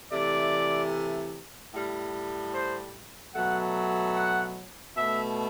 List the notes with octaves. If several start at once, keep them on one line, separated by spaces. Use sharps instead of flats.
C3 E3 A3 D5
A2 G3
C5
B2 F#3 A3 F#5
F#5
B2 A3 E5